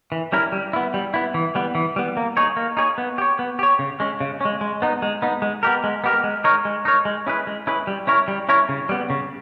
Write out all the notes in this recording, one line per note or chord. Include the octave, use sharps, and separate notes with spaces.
E3
G3 C#4 E4 A#4
G3
B3 E4
G3
B3 E4
E3
G3 B3
E3
G3 B3
A#3
D#4 G#4 C#5
A#3
D#4 G#4 C#5
B3
G4 C#5
B3
G4 C#5
C#3
G#3 C#4
C#3
G#3 C#4
G#3
B3 D#4
G#3
B3 D#4
G#3
B3 G4 A#4
G#3
B3 G4 A#4
G#3
D#4 A#4 C#5
G#3
D#4 A#4 C#5
G#3
C#4 E4 G#4 B4
G#3
C#4 E4 G#4 B4
G3
C#4 E4 A#4 C#5
G3
C#4 E4 A#4 C#5
C#3
G3 B3
C#3